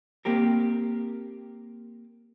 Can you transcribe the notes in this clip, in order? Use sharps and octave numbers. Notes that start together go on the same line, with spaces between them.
A#3 C4 G4 A#4